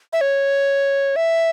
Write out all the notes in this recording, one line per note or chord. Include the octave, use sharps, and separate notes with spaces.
E5
C#5
E5